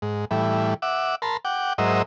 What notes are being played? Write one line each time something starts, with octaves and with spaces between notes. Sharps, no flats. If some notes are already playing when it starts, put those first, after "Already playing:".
G#2
A2 E3 G3
E5 F#5 D6
A#4 A5 B5 C6
F#5 G5 D6
G#2 F#3 A#4 C5 D#5 E5